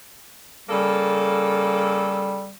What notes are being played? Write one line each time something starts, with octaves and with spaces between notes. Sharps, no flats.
C#3 G3 A#3 A4